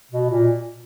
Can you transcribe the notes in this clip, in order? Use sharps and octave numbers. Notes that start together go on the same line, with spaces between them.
B2
A#2